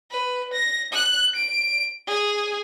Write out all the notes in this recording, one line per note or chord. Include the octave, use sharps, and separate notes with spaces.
B4
A#6
F#6
D7
G#4